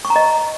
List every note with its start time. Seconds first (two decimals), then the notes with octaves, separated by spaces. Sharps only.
0.05 C#6
0.10 A#5
0.16 D#5